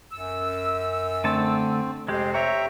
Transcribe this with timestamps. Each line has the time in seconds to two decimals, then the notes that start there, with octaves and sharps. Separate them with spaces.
0.13 F#2 E6
1.24 D3 A3 C4 A5
2.08 F2 C3 G#3 G4 C5
2.34 C#5 E5 G5 A#5